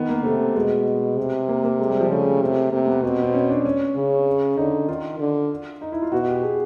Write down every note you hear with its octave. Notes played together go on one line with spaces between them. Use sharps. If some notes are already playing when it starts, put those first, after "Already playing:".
Already playing: D#3 B3
A#3
C3 A3
B2 G#3
C3
A#3
A#3
G#3
G3
F3
C#3 A3
C3
C3 A#3
B3
B2 C4
C4
C#4
D4
C#4
C#3
D3 D#4
D#3 F4
D3
D#4
E4
F4
B2 F#4
G4
G#4